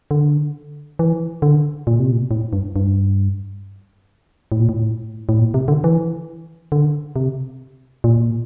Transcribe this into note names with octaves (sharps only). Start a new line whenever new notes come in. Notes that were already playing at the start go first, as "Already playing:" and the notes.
D3
E3
D3
A#2
C3
A#2
A2
G2
G2
A2
A#2
A2
A2
A#2
C3
D3
E3
D3
C3
A#2